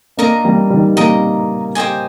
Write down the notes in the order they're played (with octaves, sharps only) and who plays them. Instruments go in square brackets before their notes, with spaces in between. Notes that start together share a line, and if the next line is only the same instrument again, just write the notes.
[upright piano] A#3 D4 [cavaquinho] A#4 D#5 A#5
[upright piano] G3 A#3
D#3 G3
[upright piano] G3 A#3 [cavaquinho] A#4 D#5 A#5
[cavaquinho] G4 C5 D#5 G#5